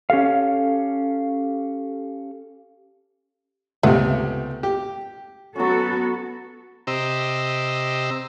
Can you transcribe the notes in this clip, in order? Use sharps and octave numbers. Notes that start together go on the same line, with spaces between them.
C#4 G4 A4 F5
C#2 C3 A3 B3
G4
F#3 B3 C#4 F#4 A4
C3 G4 C5 D#5 A#5 E6